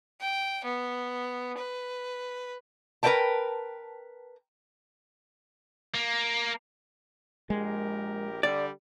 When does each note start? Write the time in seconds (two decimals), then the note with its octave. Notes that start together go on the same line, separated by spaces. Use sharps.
0.20 G5
0.64 B3
1.58 B4
3.03 A#4 B4 D5 E5 G5 A5
5.95 A#3
7.50 A#1 G#3 G4 A#4
8.43 D3 G3 D5